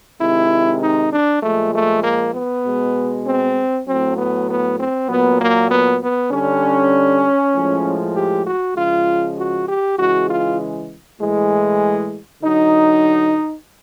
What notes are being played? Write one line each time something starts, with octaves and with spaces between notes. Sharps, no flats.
C3 D#3 G#3 E4
D#4
D4
A#2 F3 G#3 A3
A3
A#3
B3
B2 G#3
C4
A2 F#3 C4
B3
B3
C4
A#2 F#3 B3
A#3
B3
B3
D3 G3 C#4
A2 F3 G#3
G4
F#4
C#3 F3 G#3 F4
F#4
G4
C#3 E3 G#3 F#4
F4
A2 E3 G#3
D3 F#3 D#4